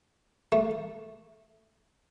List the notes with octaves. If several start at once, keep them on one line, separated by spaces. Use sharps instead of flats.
A3